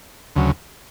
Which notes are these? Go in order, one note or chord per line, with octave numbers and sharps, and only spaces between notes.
D2 C#3 F#3